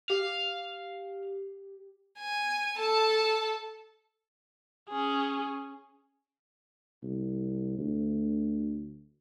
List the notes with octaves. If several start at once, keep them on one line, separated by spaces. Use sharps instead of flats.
G4 F5
G#5
A4 A5
C#4 G#4
C2
D2